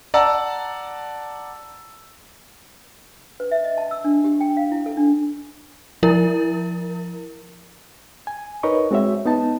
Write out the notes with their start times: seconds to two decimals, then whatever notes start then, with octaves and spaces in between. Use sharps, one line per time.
0.14 D5 F#5 A5 A#5 E6
3.40 B4
3.51 E5
3.64 D#5
3.78 A5
3.91 E6
4.04 D4
4.24 G4
4.41 G5
4.57 F5
4.72 E4
4.86 A4
4.97 D4
6.03 F3 E4 A#4
8.27 G#5
8.63 D#4 A#4 B4 C#5 D#5 C#6
8.91 G#3 C4 F#4 C#5 E5
9.26 B3 D#4 A5